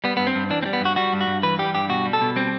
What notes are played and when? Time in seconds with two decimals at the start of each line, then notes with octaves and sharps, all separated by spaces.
0.04 G3 B3
0.17 G2 B3
0.27 C4
0.35 G2
0.50 E3 D4
0.63 C4
0.66 G3
0.73 B3
0.81 G2 F#4
0.96 G3 F#4
1.13 G2
1.21 F#4
1.27 G2
1.43 E3 B4
1.59 G3 G4
1.74 G2 G4
1.89 B2 F#4
2.05 G3
2.13 A4
2.21 B2
2.36 G3 C4